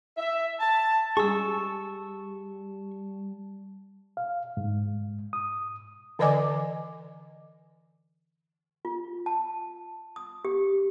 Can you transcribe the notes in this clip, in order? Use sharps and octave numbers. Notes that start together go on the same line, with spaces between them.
E5
A5
G3 G#4 A5 C#6 E6
F5
G#2
D#6
D3 E3 D5 D#5 G#5 D6
F4
A5
D#6
G4